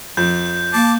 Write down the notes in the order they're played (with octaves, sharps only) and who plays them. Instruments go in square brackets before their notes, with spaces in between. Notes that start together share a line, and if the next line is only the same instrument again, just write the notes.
[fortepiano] F2 [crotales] G6
[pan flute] A#3 [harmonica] A5 D6